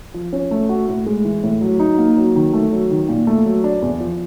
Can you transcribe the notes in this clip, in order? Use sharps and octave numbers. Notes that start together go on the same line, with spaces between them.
F3
C#4
A3
F#4
A2
G#3
E3
A2
F#3
D#4
A#3
F#3
D#3
A3
F#3
D#3
A#2
A3
F#3
D4
E2
F3